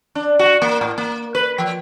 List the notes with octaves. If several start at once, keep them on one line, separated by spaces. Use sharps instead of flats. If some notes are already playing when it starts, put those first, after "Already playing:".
D4
F#4
A#3
A2
A#3
B4
F3